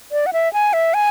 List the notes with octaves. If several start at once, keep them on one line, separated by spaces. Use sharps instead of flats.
D5
F#5
E5
G#5
E5
G#5